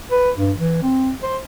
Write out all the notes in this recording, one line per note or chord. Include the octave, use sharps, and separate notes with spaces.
B4
G2
E3
C4
C5